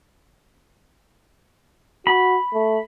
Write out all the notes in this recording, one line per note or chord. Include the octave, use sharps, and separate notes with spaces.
F#4 B5
A3